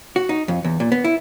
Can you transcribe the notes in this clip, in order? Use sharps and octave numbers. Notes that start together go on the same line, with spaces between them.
F#4
D#4
F2
E2
A#2
B3
E4